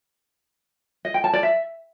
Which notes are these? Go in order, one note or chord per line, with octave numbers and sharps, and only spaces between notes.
D#5
G5
A5
D5
E5